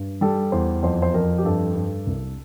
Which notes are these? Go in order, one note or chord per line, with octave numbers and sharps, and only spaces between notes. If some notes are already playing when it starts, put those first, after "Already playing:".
Already playing: G2
G3 A4
E2 C5
F2 C5
C5
F2 A#4
G4
G2 A4
G2
C2